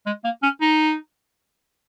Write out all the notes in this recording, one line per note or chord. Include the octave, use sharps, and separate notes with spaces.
G#3
A#3
C#4
D#4